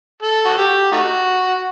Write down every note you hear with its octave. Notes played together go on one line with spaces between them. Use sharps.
A4
F#4
G4
A3 D#4 F#4